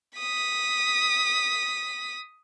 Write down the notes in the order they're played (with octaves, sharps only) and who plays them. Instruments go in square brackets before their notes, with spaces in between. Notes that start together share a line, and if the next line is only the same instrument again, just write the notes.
[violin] D#6 B6